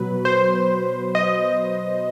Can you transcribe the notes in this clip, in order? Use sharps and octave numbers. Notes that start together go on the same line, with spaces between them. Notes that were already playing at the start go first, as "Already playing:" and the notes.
Already playing: B2 F#3 B4
C5
D#5